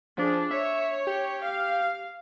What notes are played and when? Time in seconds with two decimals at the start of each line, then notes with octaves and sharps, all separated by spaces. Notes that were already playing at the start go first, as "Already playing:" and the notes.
0.18 F3 D4 G#4
0.51 C#5 E5
1.07 G4
1.43 F5